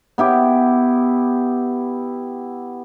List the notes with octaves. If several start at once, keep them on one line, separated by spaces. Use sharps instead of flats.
B3 E4 G4